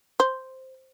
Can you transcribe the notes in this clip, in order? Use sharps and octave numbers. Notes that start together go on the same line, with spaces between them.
C5